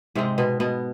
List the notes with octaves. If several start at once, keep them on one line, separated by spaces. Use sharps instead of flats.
G#2 C3 G#3 C4
B2 B3
B2 B3